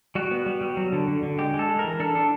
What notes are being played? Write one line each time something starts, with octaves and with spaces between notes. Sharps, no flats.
G3 F#4
B3
G3
G3
F#3
D3
D3
D3
G#3 G4
G#3
A4
G#3
A#4
E3
D4 A4
D4